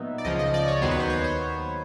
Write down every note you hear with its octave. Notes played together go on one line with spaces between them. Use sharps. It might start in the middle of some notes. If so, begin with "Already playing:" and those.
Already playing: A#2 F#3 B3 D#4 E5
D5
C#2 C#3 F3 D#5
D#5
D5
C#5
D#2 D#3 F#3 B3 C5
B4
C5
C#5
C5